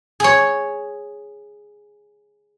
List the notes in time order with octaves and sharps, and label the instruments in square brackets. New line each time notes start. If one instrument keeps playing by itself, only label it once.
[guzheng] G#4 C#5